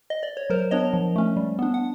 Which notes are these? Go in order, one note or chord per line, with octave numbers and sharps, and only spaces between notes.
D#5
D5
C#5
F#3 A#4 C5
B3 D4 C#5 D#5
F3
A3 C#4
G3
B3 D4
F#5